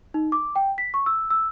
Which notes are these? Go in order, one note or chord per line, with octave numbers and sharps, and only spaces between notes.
D#4
D6
G5
B6
C#6
E6
E6